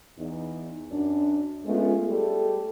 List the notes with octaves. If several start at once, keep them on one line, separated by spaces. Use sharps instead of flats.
E2 D#4
F#2 D4
G#3 A3 B3 C#4 F4
G3 A3 G#4 A4